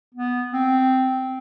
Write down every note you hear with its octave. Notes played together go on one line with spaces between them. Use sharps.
B3
C4